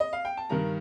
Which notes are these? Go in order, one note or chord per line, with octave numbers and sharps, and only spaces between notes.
D#5
F5
G5
A5
G2 D#3 A#4 A#5